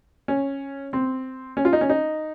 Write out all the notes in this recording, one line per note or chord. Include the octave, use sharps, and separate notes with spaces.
C#4
C4
C#4
F4
D#4
C#4
D#4